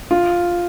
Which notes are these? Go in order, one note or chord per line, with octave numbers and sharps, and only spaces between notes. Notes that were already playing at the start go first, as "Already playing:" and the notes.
F4